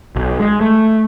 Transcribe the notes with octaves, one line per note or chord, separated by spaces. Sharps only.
B1
G#3
A3